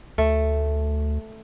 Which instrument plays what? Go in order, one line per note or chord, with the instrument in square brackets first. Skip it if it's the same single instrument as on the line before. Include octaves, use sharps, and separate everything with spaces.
[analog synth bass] D2 [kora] A3